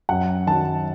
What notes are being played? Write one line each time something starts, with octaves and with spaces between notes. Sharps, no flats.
F#2 F#5
D#3 F#3 A5